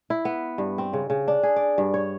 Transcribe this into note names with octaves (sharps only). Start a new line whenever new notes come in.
E4
B3
G2
C4
C#3
C#3
D4
G#4
D5
G2
C#5